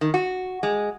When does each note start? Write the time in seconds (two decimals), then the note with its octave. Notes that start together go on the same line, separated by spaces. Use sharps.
0.01 D#3
0.14 F#4
0.63 G#3